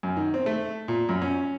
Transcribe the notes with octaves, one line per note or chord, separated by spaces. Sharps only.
F#2
D#3
C4
A3
A#2
F#2
C#4